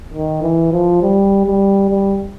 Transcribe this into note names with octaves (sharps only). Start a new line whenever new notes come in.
D#3
E3
F3
G3
G3
G3